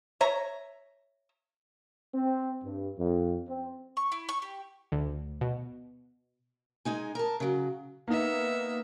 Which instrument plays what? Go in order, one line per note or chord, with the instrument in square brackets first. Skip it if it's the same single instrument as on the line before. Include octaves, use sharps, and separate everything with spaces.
[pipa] C#5 E5 A#5
[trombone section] C4
G2
F2
C4
[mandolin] C#6
E4
C#6
G4
[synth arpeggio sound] D2
B2
[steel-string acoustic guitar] G#3 D#4 G#5
A#4 A5
C#3 F#3
[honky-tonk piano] A#3 D#4 [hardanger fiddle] B3 E5